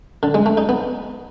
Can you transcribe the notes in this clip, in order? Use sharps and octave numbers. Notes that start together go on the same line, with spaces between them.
D3
G#3
A3
D#4
B3